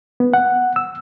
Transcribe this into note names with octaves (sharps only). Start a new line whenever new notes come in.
B3
F#5
E6